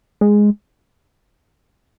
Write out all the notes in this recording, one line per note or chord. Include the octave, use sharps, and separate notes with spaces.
G#3